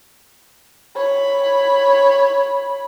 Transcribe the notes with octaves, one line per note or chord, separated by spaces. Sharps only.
C#5 B5